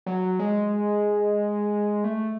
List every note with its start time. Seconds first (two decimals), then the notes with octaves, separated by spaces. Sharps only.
0.06 F#3
0.39 G#3
2.04 A3